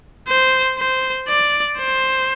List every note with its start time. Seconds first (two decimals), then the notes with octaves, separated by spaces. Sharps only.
0.28 C5
0.78 C5
1.28 D5
1.78 C5